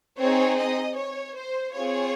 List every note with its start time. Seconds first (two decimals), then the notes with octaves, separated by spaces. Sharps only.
0.19 C4 D#4 G#4 C#5
0.58 D#5
0.96 C#5
1.36 C5
1.74 C4 F4 G#4 C#5